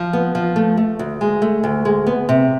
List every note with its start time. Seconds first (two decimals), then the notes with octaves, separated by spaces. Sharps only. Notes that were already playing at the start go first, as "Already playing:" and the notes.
Already playing: F3
0.13 B3
0.35 F3
0.56 A3
0.77 A3
0.99 D2
1.21 G#3
1.42 A3
1.64 D2
1.85 G#3
2.07 B3
2.29 C3